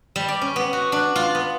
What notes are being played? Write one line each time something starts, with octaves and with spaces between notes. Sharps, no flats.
G3
D5
C#4
B3
F#4
D4
F4
B3